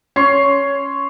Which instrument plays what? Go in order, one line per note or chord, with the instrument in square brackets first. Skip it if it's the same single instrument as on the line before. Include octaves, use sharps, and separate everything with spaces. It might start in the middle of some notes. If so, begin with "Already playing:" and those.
[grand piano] C#4 [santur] C#5 C6 C#6